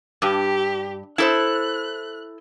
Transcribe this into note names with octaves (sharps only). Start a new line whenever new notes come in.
G2 G4
E4 A4 C5 F#6